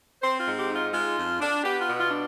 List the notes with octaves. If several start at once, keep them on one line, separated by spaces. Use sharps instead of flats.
C4 C5
F4
G#2
G4
D#4
F4
G#3 F4
F2
D4
B3 G4
F4
B2
F4
D4